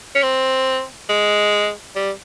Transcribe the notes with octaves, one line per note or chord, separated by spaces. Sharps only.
C#4
C4
G#3
G3